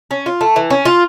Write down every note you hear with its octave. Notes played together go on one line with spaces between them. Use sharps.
C#4
F4
A3
E3
C#4
F4